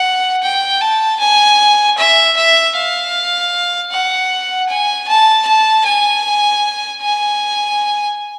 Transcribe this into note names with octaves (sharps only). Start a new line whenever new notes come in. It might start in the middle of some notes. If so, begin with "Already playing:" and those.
Already playing: F#5
G5
A5
G#5
E5
E5
F5
F#5
G#5
A5
A5
G#5
G#5